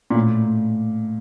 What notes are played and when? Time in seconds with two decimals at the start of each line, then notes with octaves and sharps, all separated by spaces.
0.10 A#2
0.15 A2